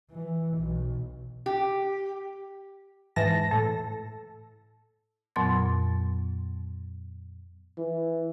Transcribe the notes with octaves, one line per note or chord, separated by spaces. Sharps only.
E3
B1
G4
G#2 E3 A5 A#6
A2 A4
F2 A#2 F#3 B3 C6 A6
E3